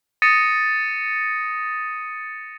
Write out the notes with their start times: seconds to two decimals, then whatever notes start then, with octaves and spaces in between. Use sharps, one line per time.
0.22 D#6 A6 A#6 C#7 D#7